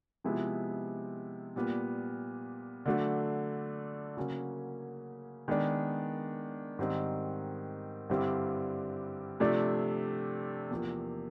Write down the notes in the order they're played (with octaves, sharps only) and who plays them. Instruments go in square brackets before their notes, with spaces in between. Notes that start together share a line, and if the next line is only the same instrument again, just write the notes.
[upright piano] C3 F3 G#3 B3 E4
A#2 G3 B3
D3 F#3 A3 D4
C#3 F#3 A#3 C#4
D#3 G#3 B3 D4
G#2 D#3 G3 C4 D#4
G2 D3 G3 C4 E4
C3 F3 A3 D4
E2 C3 F3 A#3